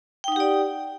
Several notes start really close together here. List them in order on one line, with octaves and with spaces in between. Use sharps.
G5 D#4 F#5 G4 D5